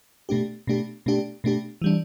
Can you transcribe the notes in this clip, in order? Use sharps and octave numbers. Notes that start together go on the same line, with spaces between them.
B2 A3 D4 G4
B2 A3 D4 G4
B2 A3 D4 G4
B2 A3 D4 G4
E3 G3 D4